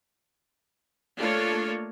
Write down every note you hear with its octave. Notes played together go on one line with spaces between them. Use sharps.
A3 A#3 D4 F4 A4 C#5